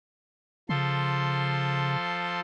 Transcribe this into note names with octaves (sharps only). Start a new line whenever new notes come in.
C#3 F3 A4 C6